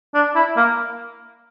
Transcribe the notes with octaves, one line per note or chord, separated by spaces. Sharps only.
D4
E4
A#3